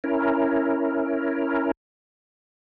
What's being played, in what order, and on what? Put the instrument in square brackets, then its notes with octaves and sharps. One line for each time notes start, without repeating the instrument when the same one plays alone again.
[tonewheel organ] C#4 E4 A#4